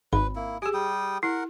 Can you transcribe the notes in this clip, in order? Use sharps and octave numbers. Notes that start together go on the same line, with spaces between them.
G#1 B4 B5
A#3 E4
G4 G#4 G#5 D#6
G3 G5 D#6
E4 A#4 F#5